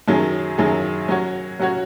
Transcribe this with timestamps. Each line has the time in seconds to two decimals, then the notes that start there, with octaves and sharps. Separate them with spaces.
0.08 F#2 D#3 F#3 C#4 G#4
0.58 F#2 D#3 F#3 C#4 G#4
1.08 F#3 C#4 F#4 C#5
1.60 F#3 C#4 F#4 C#5